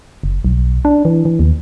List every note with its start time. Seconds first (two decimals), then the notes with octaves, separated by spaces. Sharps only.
0.23 F#1
0.45 B1
0.85 D4
1.05 E3
1.25 E3
1.39 D#2